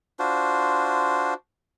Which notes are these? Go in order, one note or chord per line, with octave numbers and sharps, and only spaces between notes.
D4 F4 F#4 C5